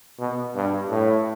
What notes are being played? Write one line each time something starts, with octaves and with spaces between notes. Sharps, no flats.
B2
G2
A2